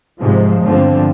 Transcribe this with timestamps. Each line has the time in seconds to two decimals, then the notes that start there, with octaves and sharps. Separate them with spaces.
0.20 G#2 C3 F3 G#3
0.65 G1 D3 F3 C4